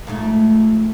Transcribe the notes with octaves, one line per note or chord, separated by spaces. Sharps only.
F2 G#2 A3